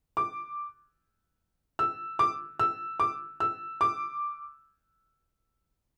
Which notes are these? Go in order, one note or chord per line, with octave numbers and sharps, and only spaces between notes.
D6
E6
D6
E6
D6
E6
D6